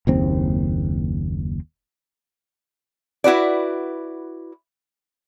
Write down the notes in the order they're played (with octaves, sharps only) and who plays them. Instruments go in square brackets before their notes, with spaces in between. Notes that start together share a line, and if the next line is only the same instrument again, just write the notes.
[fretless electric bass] F#1 D#2 C4
[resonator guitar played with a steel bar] E4 F#4 B4 D5